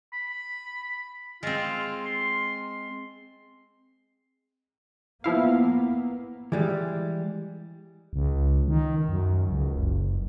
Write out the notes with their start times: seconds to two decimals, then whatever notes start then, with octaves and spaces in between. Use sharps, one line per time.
0.13 B5
1.43 G#3 C4 F4
2.05 C6
5.24 F3 A#3 B3 E4 F5
6.52 E3 G3 G#3
8.13 C#2
8.68 D#3
9.09 F#2
9.49 C#2
9.76 F#1